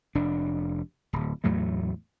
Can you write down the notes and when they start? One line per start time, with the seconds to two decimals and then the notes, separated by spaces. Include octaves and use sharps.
0.15 F1 D4
1.13 D1
1.44 E2 A2 F#3 A3